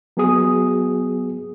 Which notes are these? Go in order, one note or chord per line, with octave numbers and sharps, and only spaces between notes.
F#3 B3 F#4 G#4 D#6